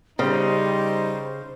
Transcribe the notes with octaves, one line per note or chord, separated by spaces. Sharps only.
C#3 G3 D#4 C5